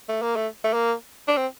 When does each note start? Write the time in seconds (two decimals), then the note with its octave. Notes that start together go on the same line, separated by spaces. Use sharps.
0.09 A3
0.22 A#3
0.36 A3
0.64 A3
0.73 A#3
1.28 D4
1.37 C4